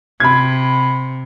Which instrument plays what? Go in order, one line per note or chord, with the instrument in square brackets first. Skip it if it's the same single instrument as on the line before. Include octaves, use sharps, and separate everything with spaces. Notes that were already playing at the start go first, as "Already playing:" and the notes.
[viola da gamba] C3 [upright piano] B5 G#6